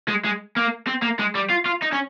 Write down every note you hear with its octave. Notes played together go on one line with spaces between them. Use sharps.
G#3
G#3
A#3
C4
A#3
G#3
G3
F4
F4
D#4
C#4